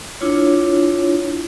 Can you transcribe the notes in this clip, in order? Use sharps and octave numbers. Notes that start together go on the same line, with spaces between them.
D4 E4 F4 C#5